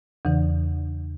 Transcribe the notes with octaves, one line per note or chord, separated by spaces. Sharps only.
E2 C#3 E3